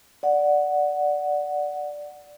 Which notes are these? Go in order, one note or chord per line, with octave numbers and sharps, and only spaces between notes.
D5 F#5